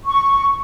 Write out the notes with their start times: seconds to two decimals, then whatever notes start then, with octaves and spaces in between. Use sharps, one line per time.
0.05 C#6